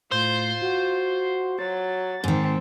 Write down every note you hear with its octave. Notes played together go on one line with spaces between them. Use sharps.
A2 F4 C5
F#4
F#3 A6
G#2 D#3 C4